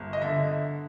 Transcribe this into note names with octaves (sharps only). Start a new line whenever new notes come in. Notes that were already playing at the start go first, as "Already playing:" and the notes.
Already playing: G1
D#5
D3 E5